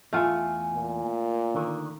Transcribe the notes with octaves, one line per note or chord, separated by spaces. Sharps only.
E2 A3 F4 F#5 G#5
A#2
D3 D#3